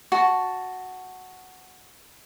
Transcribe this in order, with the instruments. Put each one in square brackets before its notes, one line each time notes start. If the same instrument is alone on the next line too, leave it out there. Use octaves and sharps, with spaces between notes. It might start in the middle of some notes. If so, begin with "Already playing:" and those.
[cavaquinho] F#4 A5